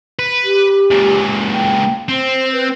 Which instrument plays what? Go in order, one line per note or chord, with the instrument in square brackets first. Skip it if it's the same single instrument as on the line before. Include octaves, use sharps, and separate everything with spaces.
[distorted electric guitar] B4
[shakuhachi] G4
[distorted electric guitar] C#2 A#2
[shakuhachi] G5
[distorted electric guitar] C4 [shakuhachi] C5
[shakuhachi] B4